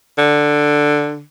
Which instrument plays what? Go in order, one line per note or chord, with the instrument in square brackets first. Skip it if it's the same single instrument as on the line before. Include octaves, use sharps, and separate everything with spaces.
[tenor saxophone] D3